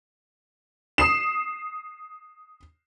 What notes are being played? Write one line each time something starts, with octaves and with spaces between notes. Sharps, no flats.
D#6 C7 E7